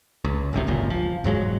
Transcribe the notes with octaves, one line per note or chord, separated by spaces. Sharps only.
C#2
F#1 C2 F#2 C3
D1 G1 C#2 A#2
F3
E1 G#2 F#3 G#3